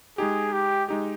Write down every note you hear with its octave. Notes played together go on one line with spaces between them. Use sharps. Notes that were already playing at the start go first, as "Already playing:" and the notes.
G#3 D#4 G4 G#4
G4
G#3 D#4 G4